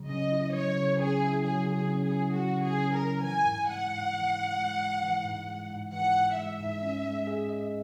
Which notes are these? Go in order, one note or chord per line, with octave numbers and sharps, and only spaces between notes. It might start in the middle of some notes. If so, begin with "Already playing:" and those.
Already playing: C#3 F#3
C#4 D#5
E4
F#3 C#5
C#3
C#4 G#4
E4
F#3 G#4
C#3
G#4
C#4
G#4
E4
F#3 F#4
C#3
G#4
C#4
A#4
E4
E3 G#5
G#2
G#3 F#5
G#2
E3
G#2
G#3
G#2
E3
G#2
G#3
G#2
E3 F#5
G#2
G#3 E5
G#2
C#4
G#3
G#4
D#5